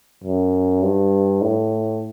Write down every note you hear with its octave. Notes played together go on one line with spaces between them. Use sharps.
F#2
G2
A2